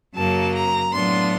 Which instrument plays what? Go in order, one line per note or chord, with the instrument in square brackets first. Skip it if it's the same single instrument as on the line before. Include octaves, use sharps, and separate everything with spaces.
[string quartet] F#2 C#3 F#3 A#3 A5
A#5
A2 F#3 B3 D4 F4 C6